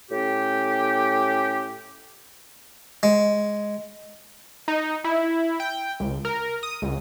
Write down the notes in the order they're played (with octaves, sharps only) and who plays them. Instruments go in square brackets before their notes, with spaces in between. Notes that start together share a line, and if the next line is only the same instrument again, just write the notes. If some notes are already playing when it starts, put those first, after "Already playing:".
[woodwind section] A2 C#4 G4
[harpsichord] G#3
[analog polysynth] D#4
E4
G5
C#2
A#4
D#6
C#2